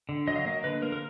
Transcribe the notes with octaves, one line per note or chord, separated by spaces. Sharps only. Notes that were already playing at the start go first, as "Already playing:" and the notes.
D3
F#3 D#5
F5
A#3 D#5
D3 B4
A#3 A#4
A#4